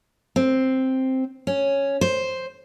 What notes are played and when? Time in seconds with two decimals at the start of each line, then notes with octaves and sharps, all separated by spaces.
0.36 C4
1.47 C#4
2.01 C5